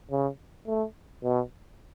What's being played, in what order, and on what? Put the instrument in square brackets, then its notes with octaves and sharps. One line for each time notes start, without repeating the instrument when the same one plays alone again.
[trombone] C#3
A3
B2